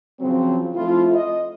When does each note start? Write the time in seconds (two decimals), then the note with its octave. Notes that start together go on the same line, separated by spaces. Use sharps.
0.20 C#3 F3 F#3 C4
0.75 F3 A3 C4 E4 F4
1.15 D#5